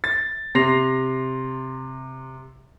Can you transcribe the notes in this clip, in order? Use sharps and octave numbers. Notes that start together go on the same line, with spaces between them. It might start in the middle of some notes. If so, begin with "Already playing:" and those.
A6
C3 C6 A#6 C7 F7